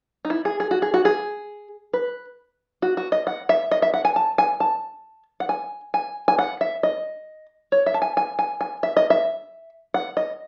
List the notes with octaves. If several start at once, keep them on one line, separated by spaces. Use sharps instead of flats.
D#4
E4
G#4
G#4
F#4
G#4
F#4
G#4
B4
F#4
F#4
D#5
F#5
E5
D#5
E5
F#5
G#5
A5
G#5
A5
F#5
G#5
G#5
G#5
F#5
E5
D#5
C#5
E5
A5
G#5
G#5
G#5
G#5
E5
D#5
E5
F#5
D#5